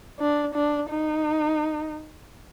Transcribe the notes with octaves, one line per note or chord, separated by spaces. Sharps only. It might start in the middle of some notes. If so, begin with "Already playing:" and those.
D4
D4
D#4